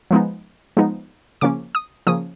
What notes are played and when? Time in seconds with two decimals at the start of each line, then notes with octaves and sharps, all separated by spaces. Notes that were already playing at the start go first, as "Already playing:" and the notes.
0.11 F3 G#3 B3 D#4
0.77 F3 G#3 B3 D#4
1.41 C#3 F3 A#3 C#4 D6
1.75 D#6
2.07 C#3 F3 A#3 C#4 D#6